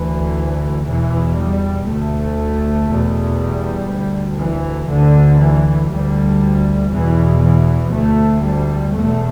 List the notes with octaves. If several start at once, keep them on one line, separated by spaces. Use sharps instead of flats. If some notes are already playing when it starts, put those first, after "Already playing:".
Already playing: D2 E3
E2 B2 E3
G3
D2 A3
E2 B2
G3
D2
E3
D2 D3
E3
D2 G3
E2 B2 E3
E3
D2 A3
G3
E2 B2 A3